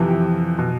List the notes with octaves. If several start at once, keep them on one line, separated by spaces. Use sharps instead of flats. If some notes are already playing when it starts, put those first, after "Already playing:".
Already playing: F2 C3 E3
G4
B2